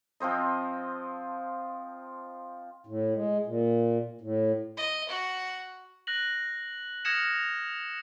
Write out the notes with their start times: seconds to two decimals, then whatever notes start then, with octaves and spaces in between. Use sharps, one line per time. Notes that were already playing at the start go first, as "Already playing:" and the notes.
0.20 F3 C4 C5 D#5
2.87 A2
3.15 G#3
3.46 A#2
4.21 A2
4.77 D#5
5.09 F#4
6.07 F#6 A#6 F#7
7.05 D#6 F6 G#6 A#6 C#7 E7